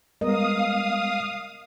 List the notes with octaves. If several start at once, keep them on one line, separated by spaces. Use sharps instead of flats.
G3 G#3 B3 A#4 D#5 F5 D#6